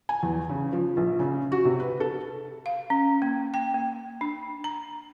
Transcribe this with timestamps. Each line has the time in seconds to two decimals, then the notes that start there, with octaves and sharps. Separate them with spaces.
0.09 G#5
0.23 E2
0.49 C#3
0.73 F3
0.97 A#1
1.19 C#3
1.52 F#4
1.65 C3
1.80 B4
2.00 A4
2.66 F5
2.90 C#4
3.22 A#3
3.54 G5
3.74 A#3
4.21 D4
4.64 A#5